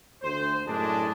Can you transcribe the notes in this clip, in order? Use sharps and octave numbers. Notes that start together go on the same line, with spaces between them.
D2 C5
F#2 A2 G#3 D4